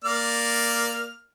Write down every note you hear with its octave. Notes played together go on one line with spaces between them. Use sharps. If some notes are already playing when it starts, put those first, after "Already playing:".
A#3 D5 F6